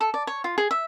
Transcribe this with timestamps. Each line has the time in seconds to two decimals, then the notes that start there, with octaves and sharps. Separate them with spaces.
0.01 A4
0.14 D5
0.27 C#5
0.44 F4
0.58 G#4
0.71 E5